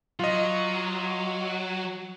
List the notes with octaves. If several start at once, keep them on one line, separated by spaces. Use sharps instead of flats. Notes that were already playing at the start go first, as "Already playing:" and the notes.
F#3 F4 D#5